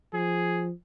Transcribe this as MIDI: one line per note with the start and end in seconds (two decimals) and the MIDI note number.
0.14 0.71 53
0.14 0.67 68